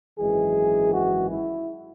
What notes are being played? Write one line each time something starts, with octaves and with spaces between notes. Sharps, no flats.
G#1 F#2 E3 G#3 G#4
F#4
E4